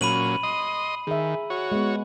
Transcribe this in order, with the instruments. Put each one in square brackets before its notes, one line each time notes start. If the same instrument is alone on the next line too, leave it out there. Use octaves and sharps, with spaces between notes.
[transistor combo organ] A#2 F#3 C#4 [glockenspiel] B5 D#7 F#7
[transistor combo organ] D#5 C6 D#6
[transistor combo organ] D#3 [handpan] G#4 E5
[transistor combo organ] F#4 C#5
[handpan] G#3 B3